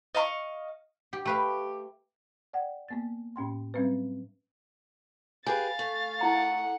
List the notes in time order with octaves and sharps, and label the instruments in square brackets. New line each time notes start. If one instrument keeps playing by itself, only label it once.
[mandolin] D#5 F5 B5 C#6
[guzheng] G4
[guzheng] A3 B4 F5 [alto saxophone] G4
[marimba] D5 F#5 G5
A#3 B3 A6
A2 C#4 G5 C6
F#3 G3 C4 C#4 B4
[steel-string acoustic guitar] G4 G#4 B4 [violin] F5 A6 [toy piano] G#5
[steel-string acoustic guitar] A3
[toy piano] D#4 E4 A#5 [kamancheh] F#5